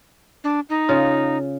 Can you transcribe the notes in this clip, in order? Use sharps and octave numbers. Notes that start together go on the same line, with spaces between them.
D4
D#4
C#3 F4